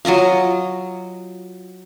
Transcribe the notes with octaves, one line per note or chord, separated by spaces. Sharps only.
F#3 F4 D#5 F5